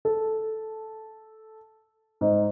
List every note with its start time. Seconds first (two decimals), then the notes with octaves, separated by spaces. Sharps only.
0.05 A4
2.21 G#2